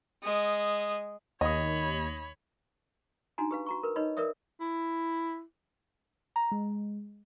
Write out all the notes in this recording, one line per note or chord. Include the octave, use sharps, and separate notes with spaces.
G#3 D#6
D#2 C#5 D#5 B5 D#6
D4 D#4 F#4 G#5 A#5
G4 B4 F5
F#4 A#5 C#6
A#4 B4
D#4 B4 C#5 D#5 B5
A#4 B4 D5 E5 D#6
E4
A#5
G#3